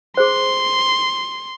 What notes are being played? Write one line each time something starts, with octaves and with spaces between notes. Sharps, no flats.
G#4 C5 C6